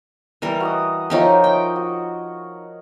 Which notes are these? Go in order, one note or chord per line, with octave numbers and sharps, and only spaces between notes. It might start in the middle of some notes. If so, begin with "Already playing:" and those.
E3 G3 A#4
F#4 D#5 D#6
F3 D#4 G4 A#4 C#5 E5
D#5 G5
F#4